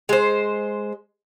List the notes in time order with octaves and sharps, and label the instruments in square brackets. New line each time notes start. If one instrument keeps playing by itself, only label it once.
[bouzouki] G#3 C5